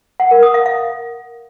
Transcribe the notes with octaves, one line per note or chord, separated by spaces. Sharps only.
F#5
A#4
D#6
F5
F5